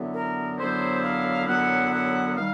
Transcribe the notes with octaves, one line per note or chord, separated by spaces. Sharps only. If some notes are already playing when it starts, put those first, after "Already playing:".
Already playing: F#2 D3 F#3 B3 E4
A#4
F#2 D3 F#3 B3 E4 C5
F5
F#2 D3 F#3 B3 E4 F#5
F#5
D#3 G3 F5